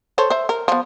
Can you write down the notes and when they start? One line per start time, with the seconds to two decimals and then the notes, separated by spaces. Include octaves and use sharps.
0.18 A4 C5 C#5
0.30 C5 E5
0.49 A#4
0.68 F3 B3